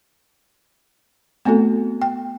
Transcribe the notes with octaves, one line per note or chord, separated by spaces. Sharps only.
A3 B3 C4 F#4 A4
G5